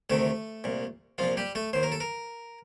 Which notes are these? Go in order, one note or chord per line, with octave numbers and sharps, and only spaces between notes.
D2 C3 D#3 A3 A4
C2 A#2
C2 A#2 F3 F4
G3 G4
A3 A4
D#2 D#3 C5
A#4
A4
A#4